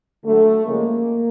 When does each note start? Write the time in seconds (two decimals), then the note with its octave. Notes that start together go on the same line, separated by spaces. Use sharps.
0.25 D3 F#3 A3
0.66 C#3 F3 G#3 A#3